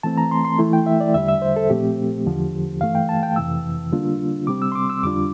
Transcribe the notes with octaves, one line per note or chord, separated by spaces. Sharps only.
E3 A3 C4 A5
A#5
C6
C6
E3 A3 E4
G5
E5
D5
E2 D3 G3 E5
E5
C5
A4
A#2 F3 A3 C4 G4
E2 D3 F3
G2 E3 A3 F5
G5
A5
G5
F2 C3 E3 E6
D3 G3 A#3 D4 F4
C3 G3 C4 D6
E6
C6
D6
E6
F2 D3 G3 D4 F4 D6